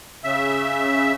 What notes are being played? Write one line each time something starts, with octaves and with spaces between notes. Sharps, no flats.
C#3 E5